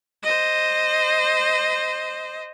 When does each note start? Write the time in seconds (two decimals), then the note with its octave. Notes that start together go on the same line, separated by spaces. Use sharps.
0.23 C5 D#5